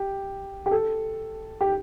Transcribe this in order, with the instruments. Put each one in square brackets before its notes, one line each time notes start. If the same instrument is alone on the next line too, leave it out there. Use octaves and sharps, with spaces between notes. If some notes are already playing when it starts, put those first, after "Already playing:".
Already playing: [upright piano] G4
G4
A4
G4